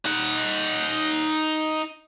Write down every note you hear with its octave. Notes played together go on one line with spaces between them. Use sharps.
D#4 F#5